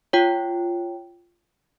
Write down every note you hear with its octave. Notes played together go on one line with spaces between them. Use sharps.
F4 C#5 G5